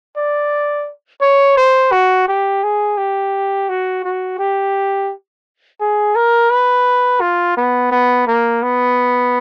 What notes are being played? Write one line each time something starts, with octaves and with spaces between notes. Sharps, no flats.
D5
C#5
C5
F#4
G4
G#4
G4
F#4
F#4
G4
G#4
A#4
B4
F4
B3
B3
A#3
B3